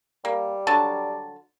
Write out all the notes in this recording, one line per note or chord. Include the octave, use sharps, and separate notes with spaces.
G3 A#3
D3 F#3 A5